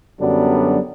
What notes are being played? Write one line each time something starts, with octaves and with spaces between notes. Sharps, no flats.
F#2 D3 F#3 G3 B3 D4